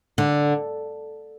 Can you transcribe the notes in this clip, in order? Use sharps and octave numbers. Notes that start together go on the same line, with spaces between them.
D3